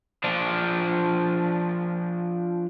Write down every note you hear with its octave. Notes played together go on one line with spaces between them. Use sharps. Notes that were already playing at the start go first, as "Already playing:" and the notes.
F3 D4